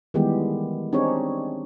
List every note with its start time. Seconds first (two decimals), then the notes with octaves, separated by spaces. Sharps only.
0.14 D#3 E3 G3 G#3 B3 G4
0.93 C4 D4 D#4 G4 G#4 C#5